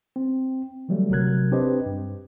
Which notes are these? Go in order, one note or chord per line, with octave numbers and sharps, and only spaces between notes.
C4
D3 E3 F#3 G3 A3
G1 C3 F#3 A#4 F#6 G#6
C4 D4 G4 B4 C5 D#5
G2